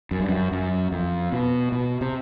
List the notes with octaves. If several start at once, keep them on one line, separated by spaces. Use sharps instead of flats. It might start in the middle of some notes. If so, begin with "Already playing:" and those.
F#2
G2
F#2
F#2
F2
B2
B2
C3